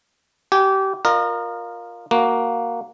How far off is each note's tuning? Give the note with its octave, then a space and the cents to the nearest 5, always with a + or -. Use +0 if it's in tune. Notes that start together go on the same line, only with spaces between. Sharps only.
G4 -25 G#5 +0
F4 +10 A#4 +0 D#5 -35
A#3 +0 F#4 +0